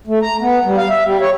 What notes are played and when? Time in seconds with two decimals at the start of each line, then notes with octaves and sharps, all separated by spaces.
0.07 A3
0.22 A#5
0.41 B3
0.65 G3
0.78 F5
0.90 E5
1.04 G3
1.21 C#5